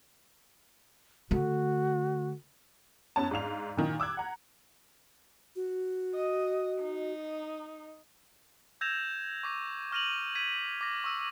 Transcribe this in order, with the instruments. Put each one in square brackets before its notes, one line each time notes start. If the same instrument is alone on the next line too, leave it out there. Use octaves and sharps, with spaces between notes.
[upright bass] D3 A3 [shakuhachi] F#4
[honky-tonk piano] F#2 B3 C#4 A5
G#2 D4 F5 F7
A#2 D#3
D6 E6 F#6 G#6
F#5 A#5
[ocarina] F#4
[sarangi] D#5
D#4
[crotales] E6 G6 G#6 A#6 E7 F7
C#6 D6 A#6
C#6 F6 A#6 D#7 F7 F#7
G#6 B6 D#7
D6 A#6
C#6 E6 D#7